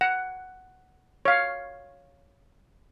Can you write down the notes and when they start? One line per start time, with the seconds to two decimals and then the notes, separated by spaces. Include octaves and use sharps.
0.01 F#5
1.25 C#5 F5